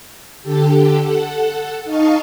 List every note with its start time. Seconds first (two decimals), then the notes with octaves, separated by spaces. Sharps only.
0.43 D3 G4 A4
1.03 A4 F#5
1.85 D#4 D#5 F5 A5 C#6